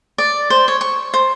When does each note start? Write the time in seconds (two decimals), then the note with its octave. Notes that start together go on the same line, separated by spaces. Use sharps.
0.18 D5
0.50 C5
0.68 C#5
0.81 C#6
1.14 C5